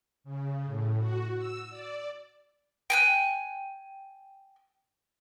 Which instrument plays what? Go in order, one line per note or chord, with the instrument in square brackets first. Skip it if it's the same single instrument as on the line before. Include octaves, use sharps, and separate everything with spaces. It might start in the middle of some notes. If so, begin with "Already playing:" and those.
[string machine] C#3
A2
F#4
E6
D5
[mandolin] G5 G#5 F#6